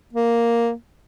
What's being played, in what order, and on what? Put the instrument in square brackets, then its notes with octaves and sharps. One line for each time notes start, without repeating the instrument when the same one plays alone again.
[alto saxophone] A#3